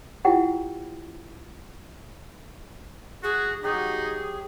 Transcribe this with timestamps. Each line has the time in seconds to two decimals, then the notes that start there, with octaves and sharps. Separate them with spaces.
0.25 E4 F4 G4 F#5 G5
3.24 F#4 G#4
3.63 F#3 D#4 G4 G#4